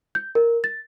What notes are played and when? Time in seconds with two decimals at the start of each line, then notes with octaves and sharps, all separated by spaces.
0.15 G6
0.35 A#4
0.64 A6